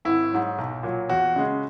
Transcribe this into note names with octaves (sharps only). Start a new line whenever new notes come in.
G#1 E4
G#2 F#3
B1
A#2 F#3
E2 F#4
C#3 G#3